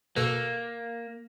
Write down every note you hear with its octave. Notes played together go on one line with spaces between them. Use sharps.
B2 A#3 A4 B4